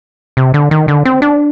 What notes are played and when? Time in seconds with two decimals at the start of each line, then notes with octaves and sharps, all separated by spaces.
0.37 C3
0.54 D3
0.71 D#3
0.88 D3
1.05 C4
1.22 D4